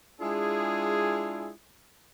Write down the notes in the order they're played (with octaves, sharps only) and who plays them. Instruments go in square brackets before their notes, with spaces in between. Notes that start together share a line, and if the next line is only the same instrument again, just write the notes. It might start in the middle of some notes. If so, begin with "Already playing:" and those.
[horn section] G#3 D4 E4 F4 G#4